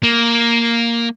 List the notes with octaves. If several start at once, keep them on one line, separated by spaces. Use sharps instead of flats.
A#3